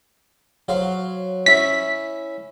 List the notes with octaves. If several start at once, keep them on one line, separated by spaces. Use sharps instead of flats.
F#3 C5 F5
C#4 E4 B6